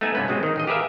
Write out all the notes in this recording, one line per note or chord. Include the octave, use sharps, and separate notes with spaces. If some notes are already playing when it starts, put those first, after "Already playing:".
A3 B3 D#4 A4 G#5
G2 C3 B3 C#4 B4
B2 F#3 G#3 C4
D#3 D#4
A1 G#4 D#5
G4 G#4 A#4 B4 E5 F5